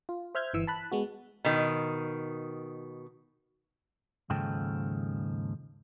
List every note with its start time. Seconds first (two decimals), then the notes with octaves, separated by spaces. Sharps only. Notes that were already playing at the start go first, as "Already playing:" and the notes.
0.09 F4
0.35 C5 E5 F6 G6 G#6
0.54 G1 E3 E6
0.67 A5 B5 F#6
0.91 G#3 B3 F#4
1.45 B2 D#3
4.30 D#2 G#2 C#3 F3 A4 G5